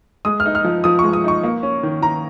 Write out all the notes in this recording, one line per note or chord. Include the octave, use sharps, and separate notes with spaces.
G#3 D#6
F6
D#4
F6
F3
F3 D#6
G#3 C#6
D#6
D#4 C#6
A#3
C#4
D#3
D#3 A#5